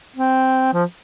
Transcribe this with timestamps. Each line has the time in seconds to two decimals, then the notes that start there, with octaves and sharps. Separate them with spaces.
0.16 C4
0.73 F3